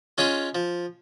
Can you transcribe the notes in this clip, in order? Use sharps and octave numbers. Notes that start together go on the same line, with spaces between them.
G#3 C#4 F4 G#4
F3